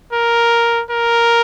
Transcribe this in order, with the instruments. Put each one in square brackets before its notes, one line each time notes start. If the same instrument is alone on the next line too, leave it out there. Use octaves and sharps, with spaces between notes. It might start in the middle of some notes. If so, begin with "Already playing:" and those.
[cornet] A#4
A#4